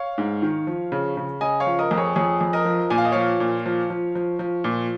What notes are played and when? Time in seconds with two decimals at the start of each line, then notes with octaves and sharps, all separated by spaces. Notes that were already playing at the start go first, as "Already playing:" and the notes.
Already playing: C#5 F5
0.18 G#2
0.42 D#3
0.67 F3
0.92 C#3
1.17 C#3
1.41 C#3 D#5 G#5
1.60 C#5 F5
1.66 F3
1.79 A#4 D#5
1.91 F2
1.97 G#4 C#5
2.15 F2 G#4 C#5
2.41 F2
2.53 A#4 D#5
2.65 F3
2.90 A#2 G#5
2.98 F5
3.05 D#5
3.12 F3 C#5 F5
3.40 A#2
3.66 F3
3.90 F3
4.15 F3
4.39 F3
4.64 A#2